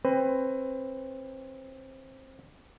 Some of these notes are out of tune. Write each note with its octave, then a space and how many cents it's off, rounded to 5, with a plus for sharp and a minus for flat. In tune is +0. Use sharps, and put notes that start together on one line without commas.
C4 +25 B4 +25